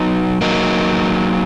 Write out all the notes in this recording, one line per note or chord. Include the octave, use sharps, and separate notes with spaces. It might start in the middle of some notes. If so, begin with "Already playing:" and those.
Already playing: F#3 B3 D#4
F#3 A#3 D#4